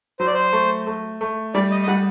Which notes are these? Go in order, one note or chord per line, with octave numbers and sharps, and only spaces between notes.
F#3 C5
D5
C5
A3
A3
A3
G3 D5
D#5
D#5
G3 F#5